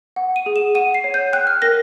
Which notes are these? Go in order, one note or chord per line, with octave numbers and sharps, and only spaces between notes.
F#5
D#7
G#4
E7
F#5 D#7
C7
C#5
G6
G5 F#6
F6
A#4 A#6